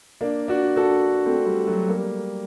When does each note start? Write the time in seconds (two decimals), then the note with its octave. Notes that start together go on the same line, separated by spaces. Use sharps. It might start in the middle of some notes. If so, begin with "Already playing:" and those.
0.21 A#3 D4
0.48 D4 F#4
0.76 F#4 A4
1.26 A3 C4
1.46 G3
1.67 F#3 A3
1.89 G3 A#3